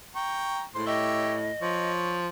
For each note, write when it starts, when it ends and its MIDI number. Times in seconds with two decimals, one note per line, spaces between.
0.15 0.64 79
0.15 0.64 82
0.15 0.64 85
0.75 1.50 45
0.75 0.84 56
0.75 0.84 72
0.75 0.84 84
0.86 1.37 67
0.86 1.37 73
0.86 1.91 75
0.86 1.37 76
1.61 2.28 53
1.61 2.16 73